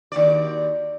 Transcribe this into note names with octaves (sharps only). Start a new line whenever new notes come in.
D#2 F#4 D5